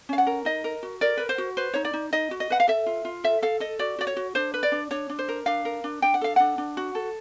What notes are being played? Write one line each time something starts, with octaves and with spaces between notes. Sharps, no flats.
C#4 F5
F#5
A#4
D#4 D#5
A#4
F#4
A#4 D5
A#4 B4
C5
F#4
B4 C5
D#4 C#5
D5
D#4
D#4 D#5
F#4
D#5
B4 F#5
F5
A4 E5
F4
F4
A4 E5
A4 F5
A4 D#5
F#4 D5
F#4 D5
C#5
F#4
D4 C5
B4
D5
D4
D4 C#5
D4
C5
A#4
D4 F5
A#4
D4
D4 G5
F#5
A4 F5
D4 F#5
D4
F#4
A4